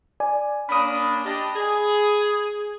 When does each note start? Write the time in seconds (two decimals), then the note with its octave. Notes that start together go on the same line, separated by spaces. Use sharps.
0.20 D5 G#5
0.69 A#3 C#4 D4 B5 D#6
1.25 D4 G4 D#5
1.55 G#4